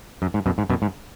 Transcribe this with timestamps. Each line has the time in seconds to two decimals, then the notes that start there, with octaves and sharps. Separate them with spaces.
0.22 F#2
0.34 G#2
0.46 F#2 B2
0.58 G#2
0.70 F#2 B2
0.82 G#2